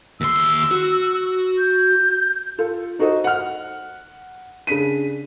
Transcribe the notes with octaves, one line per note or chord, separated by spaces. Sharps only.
D#2 C6 E6
F#4
G6
F4 A4
D#4 F#4 A4 C5 D#5
F#5 F6
C#3 D4 B6 D#7